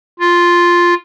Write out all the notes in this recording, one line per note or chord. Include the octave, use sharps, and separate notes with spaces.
F4